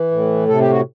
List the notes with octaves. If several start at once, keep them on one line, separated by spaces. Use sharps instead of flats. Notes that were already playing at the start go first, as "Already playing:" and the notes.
Already playing: E3
A2
C3 A4
G4
F#4